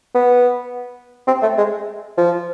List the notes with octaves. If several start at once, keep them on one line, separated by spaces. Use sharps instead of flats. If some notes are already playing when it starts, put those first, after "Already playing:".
B3
C4
A3
G#3
F3